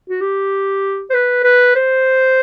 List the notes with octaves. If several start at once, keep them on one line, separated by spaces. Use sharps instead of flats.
F#4
G4
C5
B4
B4
C5